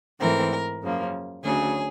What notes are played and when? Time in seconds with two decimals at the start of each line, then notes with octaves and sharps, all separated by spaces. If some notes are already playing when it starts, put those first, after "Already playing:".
0.19 G#2 E3 A3 C4 A#4
0.82 F#2 C#3 F3 A#3
1.44 D2 C#3 F#3 G#4